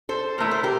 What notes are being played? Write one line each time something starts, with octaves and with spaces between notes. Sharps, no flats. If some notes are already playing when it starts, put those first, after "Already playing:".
A4 C5
A#2 A3 E4 A#4
C5
G4 A#4